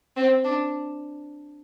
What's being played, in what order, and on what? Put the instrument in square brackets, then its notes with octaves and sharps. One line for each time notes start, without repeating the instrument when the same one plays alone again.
[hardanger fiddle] C4
D4